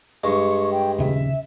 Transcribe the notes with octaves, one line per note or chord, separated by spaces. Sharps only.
G2 G#3 C#6
G5
D#1 C#3 E5